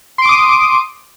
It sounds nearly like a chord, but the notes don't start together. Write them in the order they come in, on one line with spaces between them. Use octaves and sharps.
C6 D7 D6 D#6